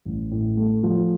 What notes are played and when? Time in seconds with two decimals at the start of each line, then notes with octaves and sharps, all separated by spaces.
0.05 A1
0.31 A2
0.57 A3
0.83 F3